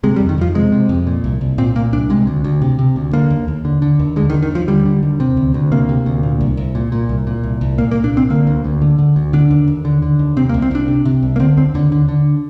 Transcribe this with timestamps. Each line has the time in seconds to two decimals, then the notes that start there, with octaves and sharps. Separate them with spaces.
0.04 C3 G#3
0.16 G3
0.20 F2
0.29 D#3
0.38 F2 F3
0.55 C3 G#3
0.72 C3
0.89 F2
1.07 A#2
1.24 C2
1.41 C2
1.58 A#2 C4
1.75 A#2 A#3
1.93 C2 D4
2.10 C3 G#3
2.27 D2
2.44 D2
2.62 C3
2.79 C3
2.96 D2
3.13 D3 A#3
3.30 D#2
3.48 D#2
3.65 D3
3.82 D3
3.99 D#2
4.16 D3 G#3
4.30 D#3
4.34 D#2
4.43 D#3
4.51 D#2 F3
4.68 D3 G3
4.85 D3
5.03 D#2
5.20 C3
5.37 D2
5.54 D2
5.72 C3 A#3
5.89 C3
6.06 D2
6.23 A#2
6.41 C2
6.57 C2
6.75 A#2
6.92 A#2
7.09 C2
7.27 A#2
7.43 C2
7.61 C2
7.78 A#2 A#3
7.91 A#3
7.95 A#2
8.04 D4
8.13 C2 C4
8.30 D3 A#3
8.47 D2
8.64 D2
8.82 D3
8.99 D3
9.16 D2
9.33 D3 D4
9.51 D#2
9.68 D#2
9.85 D3
10.02 D3
10.19 D#2
10.37 C3 C4
10.49 A#3
10.54 C2
10.62 C4
10.71 C2 D4
10.88 C3
11.05 C3
11.23 C2
11.36 A#3
11.40 D3 C4
11.57 D#2 C4
11.74 D#2 D3
11.92 D3
12.08 D3